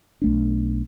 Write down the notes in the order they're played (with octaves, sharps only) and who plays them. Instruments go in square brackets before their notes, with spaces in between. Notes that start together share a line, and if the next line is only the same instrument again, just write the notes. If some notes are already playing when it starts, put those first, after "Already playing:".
[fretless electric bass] B1 A3 D4